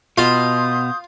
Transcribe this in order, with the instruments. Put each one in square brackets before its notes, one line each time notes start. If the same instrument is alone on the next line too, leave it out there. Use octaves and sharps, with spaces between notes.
[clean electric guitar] B2 [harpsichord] F4 [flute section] C6 D#6 G6